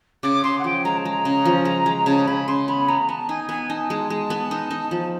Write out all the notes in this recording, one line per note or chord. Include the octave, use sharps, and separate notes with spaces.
C#3 D6
C#3 C6
F#5
F3 G5
G#3 A#5
A5
G#3 A#5
C#3
F3
G#3
G#3
C#3 A5
C#3 B5
C#3 C6
B3 B5
B3 A#5
B3 A5
D#4 G#5
B3 G#5
D#4 A5
G#3
G#3
B3
D#4
D#4
F3